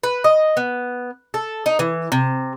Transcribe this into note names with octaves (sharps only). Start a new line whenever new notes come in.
B4
D#5
B3
A4
D#4
E3
C3